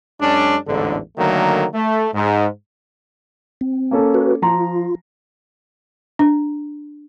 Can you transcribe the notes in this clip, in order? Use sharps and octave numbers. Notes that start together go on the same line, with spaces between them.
F#2 G#3 C#4 D4
A1 E2 G#2 D3
D3 D#3 F#3 A3 A#3
A3
G#2
C4
A#3 C#4 A4
F#4 B4
F3 F4 A#5 C6
D4